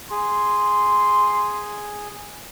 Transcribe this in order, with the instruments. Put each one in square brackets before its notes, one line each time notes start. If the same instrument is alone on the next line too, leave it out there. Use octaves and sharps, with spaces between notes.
[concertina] G#4 [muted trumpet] C6